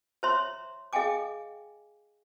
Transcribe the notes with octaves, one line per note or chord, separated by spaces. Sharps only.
C5 C#5 E5 A#5 C6
G#4 D#5 F5 G5 G#5 D6